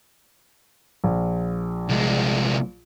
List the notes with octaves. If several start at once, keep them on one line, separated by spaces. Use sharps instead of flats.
A#1
C2 G#3